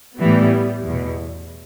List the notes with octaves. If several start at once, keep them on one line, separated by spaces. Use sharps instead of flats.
A2 E3 G3 B3
E2 B2